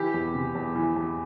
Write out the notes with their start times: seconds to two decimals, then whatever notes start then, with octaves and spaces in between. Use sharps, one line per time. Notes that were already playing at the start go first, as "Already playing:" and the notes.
Already playing: E3 G4
0.14 E2
0.34 C3
0.55 E2
0.75 E3
0.96 E2